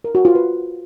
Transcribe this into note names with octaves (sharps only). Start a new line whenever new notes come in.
A#4
F#4
F4
B4